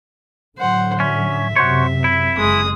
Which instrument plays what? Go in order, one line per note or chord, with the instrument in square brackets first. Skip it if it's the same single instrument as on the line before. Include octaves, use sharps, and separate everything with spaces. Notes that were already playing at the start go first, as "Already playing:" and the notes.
[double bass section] A2 D3 F#3 [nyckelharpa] C5 F#5
[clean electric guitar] C#4 [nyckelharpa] E5
[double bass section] F#2 C3 [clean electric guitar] F#4 C5 C#5
[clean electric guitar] E4
[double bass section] F#1 [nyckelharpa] G#3 D#6